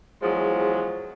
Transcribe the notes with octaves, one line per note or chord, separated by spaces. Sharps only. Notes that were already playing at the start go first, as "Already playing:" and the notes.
E2 F3 F#3 G#3